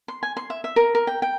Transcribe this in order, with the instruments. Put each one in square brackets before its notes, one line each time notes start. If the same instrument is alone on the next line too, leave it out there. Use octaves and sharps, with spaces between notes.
[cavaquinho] C6
G#5
C6
E5
E5
A#4
A#4
G5
G5